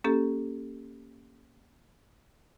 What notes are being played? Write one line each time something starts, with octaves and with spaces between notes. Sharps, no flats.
A#3 C#4 G4 A4